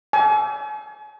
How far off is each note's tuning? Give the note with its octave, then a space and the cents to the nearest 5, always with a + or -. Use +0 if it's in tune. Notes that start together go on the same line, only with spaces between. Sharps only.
G#5 +45